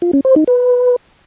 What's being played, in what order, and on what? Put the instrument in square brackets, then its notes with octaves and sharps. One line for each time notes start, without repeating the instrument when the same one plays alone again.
[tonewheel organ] F4
C#4
C5
D#4
B4